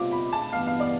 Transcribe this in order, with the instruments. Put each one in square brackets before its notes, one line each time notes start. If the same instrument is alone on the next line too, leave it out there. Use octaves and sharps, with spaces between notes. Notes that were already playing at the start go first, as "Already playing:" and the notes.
Already playing: [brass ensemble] C3 G3 B3 F4 [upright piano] D6
[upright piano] B5
A5
[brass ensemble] G2 E3 B3 [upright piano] F5
[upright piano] F5
D5